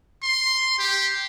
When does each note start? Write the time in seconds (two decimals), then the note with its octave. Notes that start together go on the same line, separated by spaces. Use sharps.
0.23 C6
0.79 G4